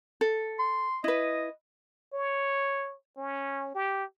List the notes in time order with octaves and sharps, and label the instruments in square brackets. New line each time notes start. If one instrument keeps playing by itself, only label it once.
[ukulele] A4
[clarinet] C6
[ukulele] E4 B4 [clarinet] D#5
[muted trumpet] C#5
C#4
G4